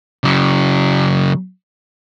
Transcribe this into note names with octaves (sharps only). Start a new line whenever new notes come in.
C#3 F#3